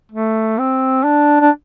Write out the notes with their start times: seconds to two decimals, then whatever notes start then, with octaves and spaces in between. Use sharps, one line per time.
0.12 A3
0.58 C4
1.04 D4
1.41 D4